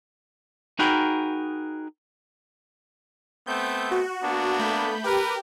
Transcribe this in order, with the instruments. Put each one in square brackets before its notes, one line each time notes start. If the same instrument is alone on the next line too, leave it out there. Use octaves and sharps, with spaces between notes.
[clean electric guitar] D#4 F#4 G#4 A#4 G5 B5
[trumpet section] A3 B3 C4 [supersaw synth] G6
[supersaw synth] F#4
[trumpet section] A#3 B3 D4
[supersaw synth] A3 B5 G6
[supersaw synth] G4 [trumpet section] A#4 B4